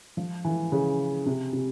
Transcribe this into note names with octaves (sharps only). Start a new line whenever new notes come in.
F3
E3
C#3
C3
C3